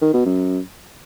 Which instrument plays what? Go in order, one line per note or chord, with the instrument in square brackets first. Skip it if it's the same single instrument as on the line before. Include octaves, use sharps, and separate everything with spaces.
[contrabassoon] D#3
B2
F#2